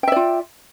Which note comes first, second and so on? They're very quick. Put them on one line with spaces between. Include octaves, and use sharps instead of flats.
G5 E5 D5 F4